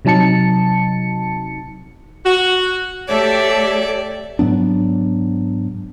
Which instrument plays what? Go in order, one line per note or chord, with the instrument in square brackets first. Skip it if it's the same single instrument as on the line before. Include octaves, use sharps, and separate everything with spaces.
[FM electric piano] C3 F#3 D#4 A5 C#7
[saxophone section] F#4
[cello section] A3 G4 A4 [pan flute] C#5 [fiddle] D5 E5
[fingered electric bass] G#2 F#3 B3 D4